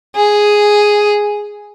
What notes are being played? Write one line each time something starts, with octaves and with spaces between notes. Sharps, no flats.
G#4